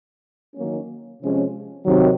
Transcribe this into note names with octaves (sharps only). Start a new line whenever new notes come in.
D#3 F#3 A#3 C#4
C3 F3 G#3 C#4
C3 D#3 F#3